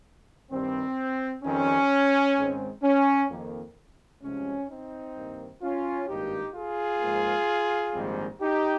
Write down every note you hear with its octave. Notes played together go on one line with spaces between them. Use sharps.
G2 D#3 G3 C4
F2 D#3 G3 C4 C#4
G#2 D#3 G#3 C4
C#4
F2 D#3 A#3
C2 C3 F3 G#3 C#4
C4 D#4
G2 D#3 A#3
C#4 F4
G#1 G2 D#3 A#3 D#4 G4
F4 G#4
G#2 F3 A#3
A#1 G#2 D#3 G3 C4
D#4 G4